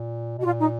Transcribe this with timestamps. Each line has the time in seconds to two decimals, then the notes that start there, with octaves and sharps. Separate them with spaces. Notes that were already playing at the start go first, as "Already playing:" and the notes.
Already playing: A#2
0.38 B2 F#4
0.44 A#2 F4
0.59 D#4